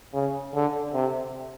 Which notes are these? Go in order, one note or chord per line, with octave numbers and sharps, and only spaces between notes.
C#3
D3
C3